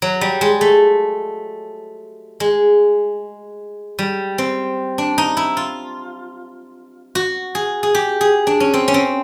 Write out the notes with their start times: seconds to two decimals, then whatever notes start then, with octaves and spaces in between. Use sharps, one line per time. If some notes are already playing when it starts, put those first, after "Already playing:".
0.02 F#3
0.21 G3
0.41 G#3
0.61 A3
2.40 G#3
3.99 G3
4.38 C4
4.98 D4
5.18 D#4
5.37 E4
5.57 F4
7.15 F#4
7.55 G#4
7.83 G#4
7.95 G4
8.21 G#4
8.47 D4
8.60 C#4
8.74 C4
8.88 C#4
8.94 C4